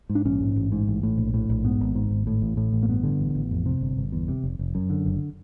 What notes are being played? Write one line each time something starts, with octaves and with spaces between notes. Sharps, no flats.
G#2
D4
A#1 C#4
G#2
A1
G#2
A1
A2
A#1
A2
A#1
G#2 B3
G#1
G#2
G#1
A2
A1
A2
A1
A#3
G2 B3
D3
A1
A1
F2
C3
G1
G1
E2
C3
F1
F1
F#2
D3
F#1